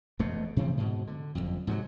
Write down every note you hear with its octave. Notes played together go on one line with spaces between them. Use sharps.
E1 F2 B2 A3
C3 E3 F3 C4
G#2 B2
D3
F#1 C2 F2
G#2 C3 E3 F#3